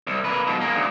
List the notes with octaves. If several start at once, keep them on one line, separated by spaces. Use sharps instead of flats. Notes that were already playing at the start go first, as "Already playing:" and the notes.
C2
A#3 B4
G#2 B2
A#3 G#4
D2